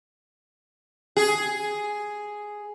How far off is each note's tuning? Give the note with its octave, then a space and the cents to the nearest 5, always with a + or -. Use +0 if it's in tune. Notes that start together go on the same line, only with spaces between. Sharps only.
G#4 +5